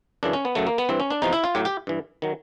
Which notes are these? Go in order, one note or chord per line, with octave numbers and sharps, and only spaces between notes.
F#2 C#3 E3 D4
C#4
B3
F#2 C#3 F#3 A3
A#3
B3
G2 E3 C4
C#4
D4
E2 C3 F3 D#4
E4
F4
A2 F#3 G4
G4
G2 E3
D#3 F#3